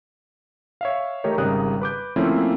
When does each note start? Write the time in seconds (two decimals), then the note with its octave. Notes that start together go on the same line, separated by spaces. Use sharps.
0.81 C#5 E5 F5
1.24 D#3 A3 D#4 G4 A#4 C#5
1.38 G#1 C#3 G3 A#4 D#6 F#6
1.81 B4 D6 G6
2.16 F3 A3 A#3 C4 C#4 E4